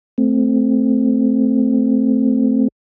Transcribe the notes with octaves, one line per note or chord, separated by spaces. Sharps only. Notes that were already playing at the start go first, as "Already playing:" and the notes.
A3 C4